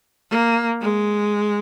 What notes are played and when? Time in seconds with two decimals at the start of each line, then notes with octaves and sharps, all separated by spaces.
0.30 A#3
0.82 G#3